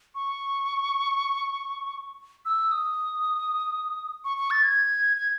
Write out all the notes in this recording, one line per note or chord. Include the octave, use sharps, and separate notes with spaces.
C#6
E6
D#6
C#6
C#6
A6
G#6
G#6